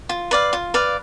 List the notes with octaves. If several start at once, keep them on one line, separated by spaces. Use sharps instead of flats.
F4
B4 D5 F5
F4
B4 D5 F5